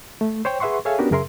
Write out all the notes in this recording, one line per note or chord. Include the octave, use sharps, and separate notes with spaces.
A3
C5 C#5 G5
G#4 B4 E5 F#5 C6 C#6
G#4 A4 C#5 E5 F5 G#5
B3 C#4 D4 F#4 G4 A#4
F#2 C#3 G#4 A#4 E5 C6